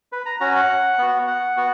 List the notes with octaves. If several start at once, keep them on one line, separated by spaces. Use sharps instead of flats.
B4
A#5
C#4 F#4 A#5
F#5
B3 F#4
F#5
B3 F#4